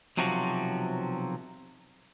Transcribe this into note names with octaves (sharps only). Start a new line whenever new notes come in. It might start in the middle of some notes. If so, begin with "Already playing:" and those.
B1 C3 F3 F#3 F#4